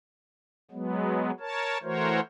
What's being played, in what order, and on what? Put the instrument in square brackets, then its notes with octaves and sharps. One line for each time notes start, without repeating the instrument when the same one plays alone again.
[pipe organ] F#3 G#3 B3
A#4 C#5 A5
E3 A3 F#4 A#4 C5 C#5